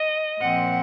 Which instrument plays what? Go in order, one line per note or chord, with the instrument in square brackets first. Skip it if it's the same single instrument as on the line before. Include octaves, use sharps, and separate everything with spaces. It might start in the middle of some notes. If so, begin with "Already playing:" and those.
Already playing: [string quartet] D#5
A#2 F3 C4 F#5